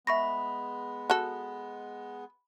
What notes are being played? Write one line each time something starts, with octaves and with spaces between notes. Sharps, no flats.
G#3 B3 E5 B5 C#6 A#6
F#4 A4